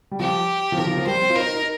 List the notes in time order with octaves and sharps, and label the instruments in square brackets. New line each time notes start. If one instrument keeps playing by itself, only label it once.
[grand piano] G3
[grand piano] F3 [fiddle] G4
[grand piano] F3
[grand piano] D#3 [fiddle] A#4
[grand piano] F3
F3
[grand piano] G3 [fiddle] C5
[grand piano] C4
F4
[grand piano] D#4 [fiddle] A#4
[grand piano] D#4